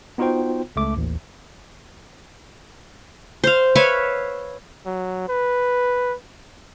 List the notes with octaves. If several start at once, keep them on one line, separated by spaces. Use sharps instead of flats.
B3 D#4 F4 F#4 C5 G5
C#2 A3 D6
A1 D#2
C5 F5
B4 C#5 E5 F5
F#3
B4